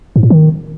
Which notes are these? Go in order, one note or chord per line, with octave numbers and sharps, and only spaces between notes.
G#2
A2
D#3